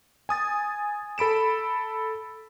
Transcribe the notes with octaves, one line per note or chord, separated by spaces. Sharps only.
G#5 D#6 A6
A4 B5 D7 E7